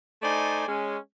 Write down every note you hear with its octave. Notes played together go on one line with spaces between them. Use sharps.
A3 D#4 C5 D5 G#5
G#3 C#4